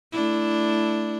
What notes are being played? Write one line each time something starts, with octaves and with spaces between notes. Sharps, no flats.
A3 D4 E4